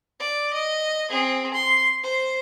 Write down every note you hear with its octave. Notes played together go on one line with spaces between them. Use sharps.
D5
D#5
C4 G#4
C6
C5